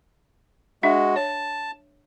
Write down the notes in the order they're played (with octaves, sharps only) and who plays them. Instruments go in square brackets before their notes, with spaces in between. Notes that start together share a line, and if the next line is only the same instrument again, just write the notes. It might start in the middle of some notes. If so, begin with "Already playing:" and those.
[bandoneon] G#3 F#4 [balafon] D4 E5
[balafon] C#5 [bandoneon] A5